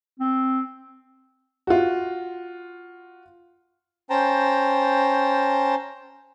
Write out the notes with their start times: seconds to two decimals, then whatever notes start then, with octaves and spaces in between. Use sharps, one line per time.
0.20 C4
1.67 F4 F#4
4.10 C#4 C5 G5 A5 A#5